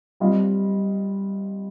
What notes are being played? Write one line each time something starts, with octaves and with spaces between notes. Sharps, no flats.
G3 C4 F4 D#5